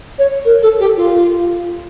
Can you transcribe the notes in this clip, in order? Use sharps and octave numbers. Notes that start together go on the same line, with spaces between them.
C#5
A#4
A4
G4
F4